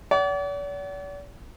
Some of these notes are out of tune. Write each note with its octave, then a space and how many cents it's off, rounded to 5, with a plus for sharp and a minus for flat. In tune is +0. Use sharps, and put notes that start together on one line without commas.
D5 -45 F#5 +35